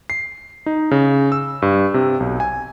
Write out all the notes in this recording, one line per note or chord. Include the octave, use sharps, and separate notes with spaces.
C7
D#4
C#3
E6
G2
C3
B1
G#5